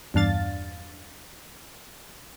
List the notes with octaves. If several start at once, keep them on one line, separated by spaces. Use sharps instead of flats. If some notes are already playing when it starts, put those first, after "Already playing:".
E2 G2 D4 F5 A6